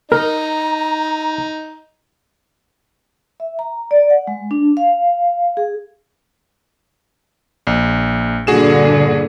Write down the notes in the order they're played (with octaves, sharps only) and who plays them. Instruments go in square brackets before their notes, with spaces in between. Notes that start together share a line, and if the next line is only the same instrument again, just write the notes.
[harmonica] D#4 [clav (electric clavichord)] A#4 [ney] A#5
[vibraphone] E5
A#5
D5
F#5
G#3
D4
F5
G#4
[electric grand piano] A#1
[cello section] G2 A#2 D3 [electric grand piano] F#4 G#4 E7